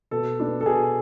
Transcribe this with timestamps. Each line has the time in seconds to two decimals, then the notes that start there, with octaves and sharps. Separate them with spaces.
0.11 B2 A4
0.40 B3 D4
0.61 A4
0.66 B2 G#4